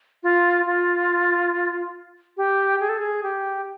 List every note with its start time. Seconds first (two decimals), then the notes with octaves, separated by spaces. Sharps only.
0.23 F4
0.66 F4
2.37 G4
2.80 G#4
2.89 A4
2.98 G#4
3.23 G4